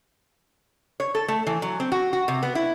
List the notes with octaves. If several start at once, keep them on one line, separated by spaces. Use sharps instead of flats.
C#5
A4
A3
E3
F#3
C4
F#4
F#4
C3
B3
E4